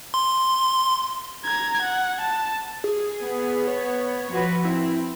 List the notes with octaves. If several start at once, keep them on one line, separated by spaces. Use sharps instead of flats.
C6
A#5 G#6
F#5
A5
G#4
B3
C#5
F3 F#4 B4
C4 E4